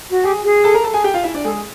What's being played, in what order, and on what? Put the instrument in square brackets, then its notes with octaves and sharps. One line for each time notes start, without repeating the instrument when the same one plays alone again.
[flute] F#4
[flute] G4 [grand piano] G#4 G#5
[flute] G#4
[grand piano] A4 A5
A#4 A#5
A4 A5
G#4 G#5
G4 G5
F4 F5
E4 E5
D4 D5
[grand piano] G#3 G#4 [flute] A4